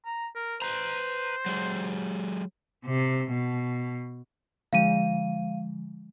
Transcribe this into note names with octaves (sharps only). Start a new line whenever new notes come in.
A#5
A#4
B4 C5 A#5
F#3 G#3
C3
B2
D3 F3 G#3 F5 D#7